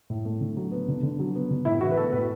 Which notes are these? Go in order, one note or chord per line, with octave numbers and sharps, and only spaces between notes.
A2
A3
D3
F#3
B3
D3
D3
F#3
B3
D3
A2 E4
E3 F#4
B4
B3 A4
A2 B4